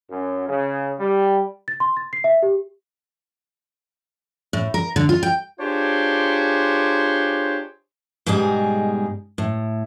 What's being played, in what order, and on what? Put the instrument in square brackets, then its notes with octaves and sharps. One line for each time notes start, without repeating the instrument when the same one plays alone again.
[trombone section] F#2
C#3
G3
[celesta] A6
C6
A6
C7
E5
G4
[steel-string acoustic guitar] A2
A#4
D3
F4
G5
[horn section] D4 F4 G4 G#4 C5 C#5
[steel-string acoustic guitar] G#2 B2 G3 D#4 G#4
A2